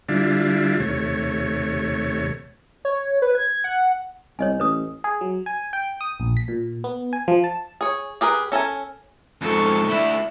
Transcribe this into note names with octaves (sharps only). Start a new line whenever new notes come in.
D3 G3 D4 E4 F4
D#2 C3 A3 C#5
C#5
B4
G#6
F#5
C2 C#5 D#5 G#5
A1 B4 D#6
G#4
F#3
G#5
G5
D#6
A#1
B6
A#2
B3
G#5
F3
A5
G#4 C#5
G4 G#4 A#4 B4
C#4 A4 A#4 G#5
F2 G#2 A4 C#6
A3 D4 E4